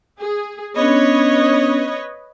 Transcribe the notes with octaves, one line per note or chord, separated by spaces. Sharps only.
G#4
B3 C#4 D4 B4 C#5 D#5